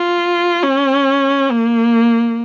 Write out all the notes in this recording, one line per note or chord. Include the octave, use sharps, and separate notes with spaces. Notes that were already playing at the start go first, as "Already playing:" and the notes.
Already playing: F4
C#4
A#3